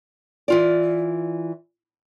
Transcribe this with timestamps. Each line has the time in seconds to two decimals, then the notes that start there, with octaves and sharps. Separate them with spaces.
0.48 E3 F4 D5